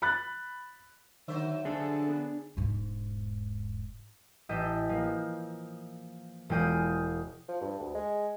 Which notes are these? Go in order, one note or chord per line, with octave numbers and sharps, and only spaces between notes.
B5 F#6 A6
D3 D#3 F#3 C5 E5
F#2 D3 D4 G#4 A4
B3
E1 G#2
A1 A3 D#5 E5 G6
F3 A#3
E1 G#3 F4 G5 D#6 G6
F3
G2
D2
G#3